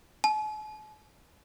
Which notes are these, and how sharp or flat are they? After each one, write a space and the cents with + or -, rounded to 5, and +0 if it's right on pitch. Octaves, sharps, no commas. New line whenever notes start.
A5 -45